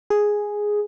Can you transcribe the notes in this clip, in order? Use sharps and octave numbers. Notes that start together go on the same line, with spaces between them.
G#4